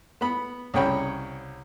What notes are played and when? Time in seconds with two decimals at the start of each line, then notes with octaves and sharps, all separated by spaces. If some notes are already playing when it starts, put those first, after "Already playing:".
0.21 B3 B5
0.74 C2 C#3 C#5 G5 B5